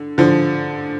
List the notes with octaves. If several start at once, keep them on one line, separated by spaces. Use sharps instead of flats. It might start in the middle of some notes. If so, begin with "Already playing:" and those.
Already playing: D3
D3 F3